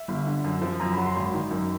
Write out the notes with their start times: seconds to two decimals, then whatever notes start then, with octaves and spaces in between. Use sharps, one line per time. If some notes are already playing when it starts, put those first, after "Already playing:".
Already playing: E5
0.08 G1
0.27 D3
0.44 F#2
0.62 F3
0.80 F#2 A#5
0.93 F#3 B5
1.06 C6
1.16 G#1 B5
1.34 D#3
1.51 F#2